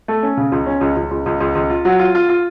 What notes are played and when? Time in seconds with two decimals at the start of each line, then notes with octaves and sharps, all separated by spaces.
0.08 A3
0.23 C#4
0.37 C#3
0.52 C#2
0.66 C#4
0.81 C#2
0.97 C#2
1.11 C#2
1.26 C#2
1.41 C#2
1.55 C#2
1.70 F4
1.85 F#3
1.99 F4
2.15 F4
2.29 F4